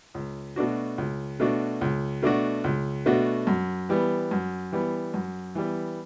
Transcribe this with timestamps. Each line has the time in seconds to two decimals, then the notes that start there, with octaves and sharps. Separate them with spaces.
0.14 C#2
0.56 B2 A3 D4 F#4
0.98 C#2
1.40 B2 A3 D4 F#4
1.81 C#2
2.22 B2 A3 D4 F#4
2.64 C#2
3.06 B2 A3 D4 F#4
3.47 F#2
3.89 E3 G3 B3
4.31 F#2
4.72 E3 G3 B3
5.14 F#2
5.55 E3 G3 B3